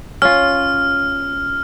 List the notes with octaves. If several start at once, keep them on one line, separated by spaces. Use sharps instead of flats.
C#4 F4 F6